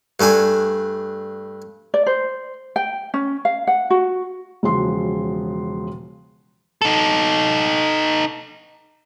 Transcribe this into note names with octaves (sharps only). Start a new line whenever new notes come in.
G2 A3 D4 G#5
D5
C5
G5
C#4
F5
F#5
F#4
E1 C#3 F3 F#4 C6
D#4 A4